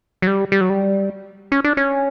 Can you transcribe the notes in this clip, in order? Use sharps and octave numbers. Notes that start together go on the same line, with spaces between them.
F#3
G3
G3
F#3
G3
C#4
D4
C#4